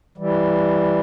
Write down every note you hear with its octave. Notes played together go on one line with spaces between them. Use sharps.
E3 G3